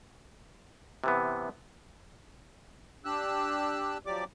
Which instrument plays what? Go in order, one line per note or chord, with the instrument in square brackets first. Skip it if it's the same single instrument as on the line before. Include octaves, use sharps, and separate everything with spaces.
[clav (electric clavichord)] C3 E3 B3
[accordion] D4 G4 E6 F#6
F3 F#3 G4 D5 D6